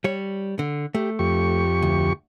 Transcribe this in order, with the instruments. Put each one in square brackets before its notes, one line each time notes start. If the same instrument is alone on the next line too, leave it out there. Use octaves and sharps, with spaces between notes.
[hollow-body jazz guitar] G3 C#5
D3
[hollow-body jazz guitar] A3 [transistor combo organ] G4
[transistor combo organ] F2 G4 C#6
[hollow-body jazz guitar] D2